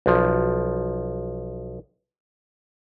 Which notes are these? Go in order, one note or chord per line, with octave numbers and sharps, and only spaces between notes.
B1 F3